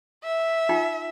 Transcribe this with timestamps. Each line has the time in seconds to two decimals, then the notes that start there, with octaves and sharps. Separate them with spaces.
0.24 E5
0.69 D#4 F4 G5